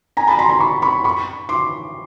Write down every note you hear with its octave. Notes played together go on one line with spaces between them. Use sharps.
G#5 A#5
A5 B5
A#5 C6
A#5 C6
B5 C#6
B5 C#6
B5 C#6
C6 D6